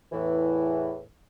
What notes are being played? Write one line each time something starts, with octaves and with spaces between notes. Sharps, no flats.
E2 A2 E3